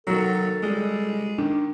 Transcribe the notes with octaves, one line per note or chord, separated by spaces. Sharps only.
D#3 F#3 F#4 A4 A#4
G3 G#3
D#3 D4